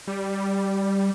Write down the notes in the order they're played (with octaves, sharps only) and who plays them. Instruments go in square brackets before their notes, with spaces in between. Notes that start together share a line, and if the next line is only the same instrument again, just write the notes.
[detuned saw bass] G3